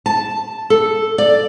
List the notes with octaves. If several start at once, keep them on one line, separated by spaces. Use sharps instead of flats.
A5
A4
D5